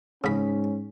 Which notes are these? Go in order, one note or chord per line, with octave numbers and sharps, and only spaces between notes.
G#2 C#3 C#4 B5